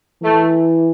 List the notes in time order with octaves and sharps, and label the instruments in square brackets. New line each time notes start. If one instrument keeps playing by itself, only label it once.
[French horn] E3 [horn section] A3